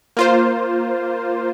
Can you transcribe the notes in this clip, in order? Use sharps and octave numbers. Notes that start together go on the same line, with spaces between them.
A#3 F4 C5